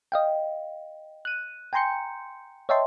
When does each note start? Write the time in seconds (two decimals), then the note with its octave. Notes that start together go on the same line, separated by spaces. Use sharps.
0.12 D#5 F5 G5
1.25 F#6 D#7
1.73 G5 G#5 A#5 C6 G6 C#7
2.69 C#5 D#5 E5 G5 A5 C6